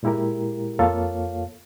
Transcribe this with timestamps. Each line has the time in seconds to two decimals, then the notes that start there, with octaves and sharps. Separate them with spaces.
0.03 A#2 G#3 E4 G4 A#4
0.79 F2 A#3 F4 A4 C#5 F5